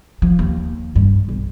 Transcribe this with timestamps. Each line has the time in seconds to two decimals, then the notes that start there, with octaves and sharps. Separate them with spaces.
0.22 F3
0.39 D#2
0.95 G2
1.29 B1